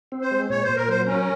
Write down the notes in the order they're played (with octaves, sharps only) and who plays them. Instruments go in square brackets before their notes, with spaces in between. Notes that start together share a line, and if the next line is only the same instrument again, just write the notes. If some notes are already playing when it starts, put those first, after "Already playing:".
[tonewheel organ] C4
[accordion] C5
[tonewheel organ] G#3
[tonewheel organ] A#2 [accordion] C#5
[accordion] C5
[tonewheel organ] A#2
[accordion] A#4
[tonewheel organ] F#3 [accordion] C5
[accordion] C#4 [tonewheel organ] A#4